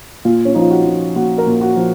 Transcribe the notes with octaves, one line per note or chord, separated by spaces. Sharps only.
A#2 F4
C#4
F3 D#4
F4
F#4
F3
A#2 F#4
A#4
A#2
F#4
F3